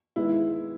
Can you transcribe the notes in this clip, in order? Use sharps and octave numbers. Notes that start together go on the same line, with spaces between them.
D#3 G#3 B3 E4